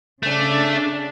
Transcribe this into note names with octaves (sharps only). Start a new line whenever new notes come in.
C#3 A3 D4